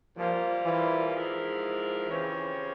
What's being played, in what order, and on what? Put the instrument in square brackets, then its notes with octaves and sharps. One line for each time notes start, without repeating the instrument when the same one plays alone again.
[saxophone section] A#2 G3 A#3 F4 C5 [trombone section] F3
[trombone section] E3
[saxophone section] G#2 F3 G#3 E4 A#4
[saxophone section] C#3 F3 C4 G4 C#5 [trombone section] E3